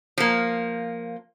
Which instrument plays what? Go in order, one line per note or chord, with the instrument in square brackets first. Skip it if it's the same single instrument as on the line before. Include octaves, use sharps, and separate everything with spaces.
[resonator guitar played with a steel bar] F3 A#3